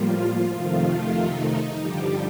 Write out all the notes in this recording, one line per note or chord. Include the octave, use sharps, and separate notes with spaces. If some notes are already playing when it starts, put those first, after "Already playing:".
Already playing: A2 F3 G3 A#3 F4
F2 C3 D#3 F3 A3 F4
D#4
G2 D3 F3 G3 G4